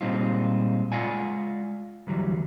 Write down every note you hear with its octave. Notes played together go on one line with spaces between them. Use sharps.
A#2 G3 G#3 C4 D#4 F4
G#3 F4 D5 F5 F#5 G#5
D2 E3 F#3 G3